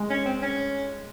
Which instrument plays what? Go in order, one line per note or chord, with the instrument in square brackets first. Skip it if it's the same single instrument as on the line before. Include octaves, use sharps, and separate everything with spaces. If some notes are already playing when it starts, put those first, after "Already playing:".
Already playing: [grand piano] G#3
[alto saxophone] C#4
C4
C#4